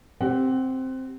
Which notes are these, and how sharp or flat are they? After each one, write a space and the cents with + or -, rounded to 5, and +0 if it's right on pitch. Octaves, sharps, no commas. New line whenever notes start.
C4 +0 G4 +0 F#5 +20